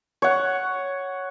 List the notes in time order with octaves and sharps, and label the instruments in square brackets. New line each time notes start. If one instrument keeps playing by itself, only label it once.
[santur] C#5 F#5